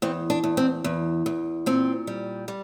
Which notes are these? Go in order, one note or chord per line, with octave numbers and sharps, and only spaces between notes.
E2 C4
D4
E2
C4
E2
E2
A#2 C4
G3
G3